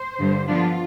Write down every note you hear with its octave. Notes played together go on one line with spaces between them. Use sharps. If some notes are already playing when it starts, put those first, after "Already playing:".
Already playing: C5
G2 D3 G3
D3 F3 B3 D4 F4